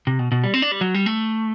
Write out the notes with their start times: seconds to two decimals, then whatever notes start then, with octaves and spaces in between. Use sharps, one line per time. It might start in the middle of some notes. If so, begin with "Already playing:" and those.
0.07 C3
0.19 B2
0.32 B2
0.44 G3
0.54 C4
0.62 D4
0.72 G3
0.81 F#3
0.94 G3
1.06 A3